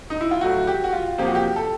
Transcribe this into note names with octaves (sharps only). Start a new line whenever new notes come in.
D#4
E4
F4
A2 F#3 A3 F#4
G4
F#4
F4
F2 C3 F3 A#3 G4
F#4
G4
A4